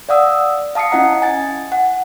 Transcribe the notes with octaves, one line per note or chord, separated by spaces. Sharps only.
D5 F5 F#5 D#6 E6
F5 A5 D#6 C7 C#7
C#4 E4 D#5 F#5 A#5
G#5 A6
F#5